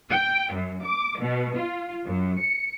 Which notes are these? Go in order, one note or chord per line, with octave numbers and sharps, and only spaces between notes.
G5
F#2
D6
B2
F4
F#2
C#7